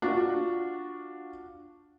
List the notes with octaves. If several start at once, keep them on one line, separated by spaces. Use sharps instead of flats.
D4 F4 F#4